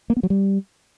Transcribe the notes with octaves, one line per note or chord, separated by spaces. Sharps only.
A#3
B3
F#3
G3